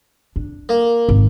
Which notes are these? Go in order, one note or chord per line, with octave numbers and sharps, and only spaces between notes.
D4
A#3
G#1